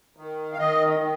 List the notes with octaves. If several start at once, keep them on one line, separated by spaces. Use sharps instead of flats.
D#3
F5
D#3 D#5
D#3